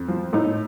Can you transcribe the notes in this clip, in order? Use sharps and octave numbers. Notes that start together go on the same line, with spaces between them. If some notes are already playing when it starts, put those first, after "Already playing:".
Already playing: F2
F3
A2 D#4